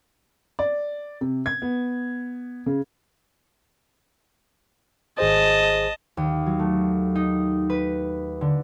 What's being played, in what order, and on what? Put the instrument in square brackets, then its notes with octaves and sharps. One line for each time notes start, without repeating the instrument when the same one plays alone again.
[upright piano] D5
C3
G#6
B3
C#3
[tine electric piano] G#1 G#4 C5 [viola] D#5 A5
[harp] D#2
F#3
A3
D#4
B4
D3